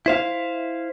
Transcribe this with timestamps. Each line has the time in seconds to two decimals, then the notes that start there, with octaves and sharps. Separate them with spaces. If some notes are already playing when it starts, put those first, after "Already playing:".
0.06 E4 C5 F5